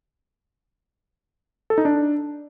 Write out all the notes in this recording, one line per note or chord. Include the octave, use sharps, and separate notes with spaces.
A4
D#4
D4